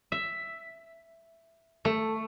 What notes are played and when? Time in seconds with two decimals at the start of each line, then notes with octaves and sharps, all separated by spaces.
0.12 E5
1.85 A3